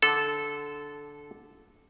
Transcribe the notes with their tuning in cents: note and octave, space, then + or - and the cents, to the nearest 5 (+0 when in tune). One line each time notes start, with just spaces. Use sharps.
D3 +0 A4 -15